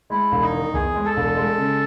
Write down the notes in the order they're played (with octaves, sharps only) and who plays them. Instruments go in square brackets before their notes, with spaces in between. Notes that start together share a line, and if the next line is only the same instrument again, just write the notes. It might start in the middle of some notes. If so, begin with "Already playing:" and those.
[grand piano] G#3 [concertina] E4
[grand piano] E1
[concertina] D#4
[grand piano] D#3
[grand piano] E2 [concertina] G#4
[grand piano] G#3
[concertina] A4
[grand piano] E1
G#3
C#3